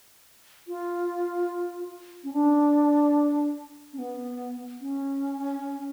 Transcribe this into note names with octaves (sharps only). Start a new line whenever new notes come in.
F4
C#4
D4
C#4
B3
C#4